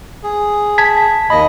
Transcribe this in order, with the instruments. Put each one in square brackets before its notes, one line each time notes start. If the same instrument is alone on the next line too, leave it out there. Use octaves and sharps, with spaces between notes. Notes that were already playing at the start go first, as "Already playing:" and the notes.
[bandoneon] G#4
[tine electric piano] A5 G#6 B6
[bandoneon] D#2 D#5 [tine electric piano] B5